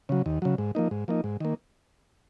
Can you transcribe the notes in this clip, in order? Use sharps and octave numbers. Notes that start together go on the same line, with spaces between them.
C#3 F#3
D#2
C#3 F#3
G#2
F3 A#3 D#4
G#2
F3 A#3 D#4
G#2
D#3 A#3